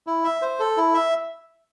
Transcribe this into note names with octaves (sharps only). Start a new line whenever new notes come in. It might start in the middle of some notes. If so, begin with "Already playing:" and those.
E4
E5
C5
A4
E4
E5